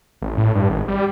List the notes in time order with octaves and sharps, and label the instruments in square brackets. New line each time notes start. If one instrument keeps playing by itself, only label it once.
[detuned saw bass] A1
A2
G2
G#1
G3